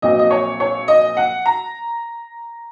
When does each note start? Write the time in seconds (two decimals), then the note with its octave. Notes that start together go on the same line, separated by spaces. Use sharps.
0.02 A#1 A#2 F#3 C4 D#5
0.19 D#5
0.31 C#5
0.60 C#5
0.88 D#5
1.17 F#5
1.46 A#5